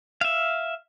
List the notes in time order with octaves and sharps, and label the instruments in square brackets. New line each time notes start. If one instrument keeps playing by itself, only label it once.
[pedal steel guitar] E5 F5